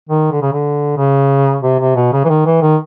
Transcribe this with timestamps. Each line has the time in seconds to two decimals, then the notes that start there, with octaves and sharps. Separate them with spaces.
0.09 D#3
0.31 D3
0.42 C#3
0.53 D3
0.97 C#3
1.63 C3
1.80 C3
1.96 B2
2.13 C#3
2.25 E3
2.29 D#3
2.46 E3
2.62 D#3